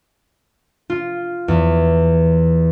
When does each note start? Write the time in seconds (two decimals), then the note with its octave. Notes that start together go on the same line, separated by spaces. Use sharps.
0.90 F4
1.48 E2